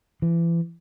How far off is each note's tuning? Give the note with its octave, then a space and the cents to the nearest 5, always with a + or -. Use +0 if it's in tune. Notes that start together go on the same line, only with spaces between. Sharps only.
E3 +35